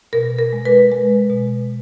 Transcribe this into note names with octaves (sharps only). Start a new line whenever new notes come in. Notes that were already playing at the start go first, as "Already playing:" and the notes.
B2 A#4
A#4
G#3
B4
G#3
B2